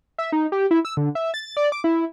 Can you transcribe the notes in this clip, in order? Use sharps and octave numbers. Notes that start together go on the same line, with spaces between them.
E5
D#4
G4
E4
E6
D3
E5
A6
D5
D6
E4